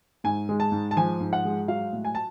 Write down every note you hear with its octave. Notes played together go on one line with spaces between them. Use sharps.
G#2 G#5
G#3
A5
G#2
A5
F3 G#5
G#2
F#5
G#3
F#3 F5
A2
G#5
A5